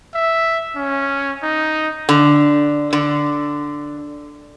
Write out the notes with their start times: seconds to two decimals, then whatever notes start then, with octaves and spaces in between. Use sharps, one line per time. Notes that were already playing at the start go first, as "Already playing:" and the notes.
0.15 E5
0.76 C#4
1.43 D#4
2.09 D3
2.93 D3